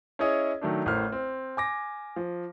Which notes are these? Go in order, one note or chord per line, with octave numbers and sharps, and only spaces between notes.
C#4 E4 G#4 C#5 D#5
D#3 F#3 A3 D4
A1 A2 A#4 C5 F6
C4
G#5 D6 A#6
F3